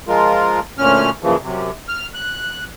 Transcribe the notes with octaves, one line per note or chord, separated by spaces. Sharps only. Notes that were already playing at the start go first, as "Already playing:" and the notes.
F3 G#3 F4 A#4
D2 A#2 C#4 F6
F#2 A#2 C#3 E3 F3
F#2 C3
F6
F#6